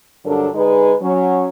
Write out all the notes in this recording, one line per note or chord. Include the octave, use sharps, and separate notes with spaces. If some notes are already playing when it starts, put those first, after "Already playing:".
G2 D3 F#3 D4 A4 A#4
D3 G#3 D#4 G#4 B4
F#3 C#4